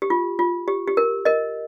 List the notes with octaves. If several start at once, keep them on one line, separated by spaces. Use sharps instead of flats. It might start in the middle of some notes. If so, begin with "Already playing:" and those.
G4
F4
F4
G4
G4
A#4
A#4 D#5